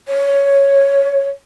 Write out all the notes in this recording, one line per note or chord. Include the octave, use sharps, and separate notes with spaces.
C#5